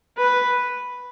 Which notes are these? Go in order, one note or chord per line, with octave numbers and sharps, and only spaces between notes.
B4